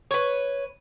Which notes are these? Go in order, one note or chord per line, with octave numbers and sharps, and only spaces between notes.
B4 C#5